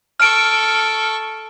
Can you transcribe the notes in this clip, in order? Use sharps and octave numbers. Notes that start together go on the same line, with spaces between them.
A4 C#6 F6 D7